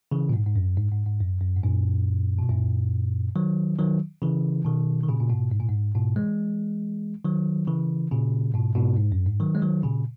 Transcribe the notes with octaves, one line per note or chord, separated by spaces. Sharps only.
C#3 E3
A#2
G#2
G#2
F#2
G#2
G#2
G#2
F#2
F#2
G#2
F#2 A#2
B2
F#2 A#2
D#3 F#3
D#3 F#3
C#3 E3
B2 D#3
D#3
A#2 C#3
A#2
G#2 B2
G#2
A#2
G#2
G#2 B2
E3 G#3
D#3 F#3
C#3 E3
A#2 C#3
G#2 B2
G#2 B2
G#2
F#2
G#2
D#3 F#3
G#3
D#3 F#3
A#2 C#3